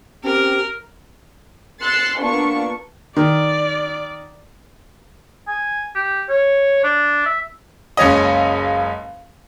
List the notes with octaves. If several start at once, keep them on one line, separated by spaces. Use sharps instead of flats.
C4 C#4 G4 A#4
C6 E6 F#6 A6 C7 C#7
A#3 B3 D4 F4 A5 C#6
D#3 D5
G#5
G4
C#5
D4
E5
F#1 C#2 C#4 D#5